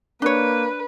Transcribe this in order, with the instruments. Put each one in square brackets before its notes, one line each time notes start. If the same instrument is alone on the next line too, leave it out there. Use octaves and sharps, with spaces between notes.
[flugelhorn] A#3 [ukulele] D4 C#5 [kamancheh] B4